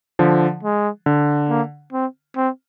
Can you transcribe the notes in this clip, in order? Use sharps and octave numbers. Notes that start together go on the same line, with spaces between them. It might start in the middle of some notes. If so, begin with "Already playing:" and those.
D3 F3
G#3
D3
A#3
C4
C4